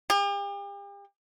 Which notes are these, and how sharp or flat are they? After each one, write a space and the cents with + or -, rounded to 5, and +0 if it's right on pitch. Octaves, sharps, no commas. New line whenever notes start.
G4 +40